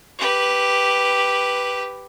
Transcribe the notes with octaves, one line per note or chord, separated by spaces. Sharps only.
G4 B4